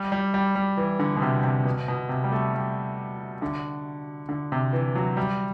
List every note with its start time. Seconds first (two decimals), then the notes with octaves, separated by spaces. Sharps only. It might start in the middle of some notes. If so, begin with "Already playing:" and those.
Already playing: G3
0.12 G3
0.34 G3
0.55 G3
0.77 E3
0.99 D3
1.16 B2
1.22 C3
1.43 C3
1.65 B2
1.88 B2
2.09 C3
2.24 G3
2.32 A3
2.54 G3
3.42 D3
4.29 D3
4.52 C3
4.73 E3
4.96 F#3
5.17 G3